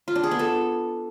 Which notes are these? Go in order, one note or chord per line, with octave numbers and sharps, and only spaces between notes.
F4
D4
G#4
B3
A4